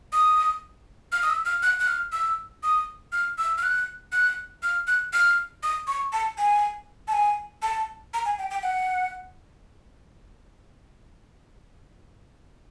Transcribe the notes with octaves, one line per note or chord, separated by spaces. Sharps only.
D#6
F6
D#6
E6
F6
F#6
F#6
F6
E6
D#6
F6
E6
F6
F#6
F#6
F6
F#6
F6
D#6
C#6
A5
G#5
A5
G#5
A5
A#5
G#5
G5
G5
F#5